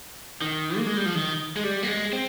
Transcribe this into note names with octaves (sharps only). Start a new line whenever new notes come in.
D#3
A#3
G#3
G3
F3
D#3
G#3
G3
A#3
G#3
C4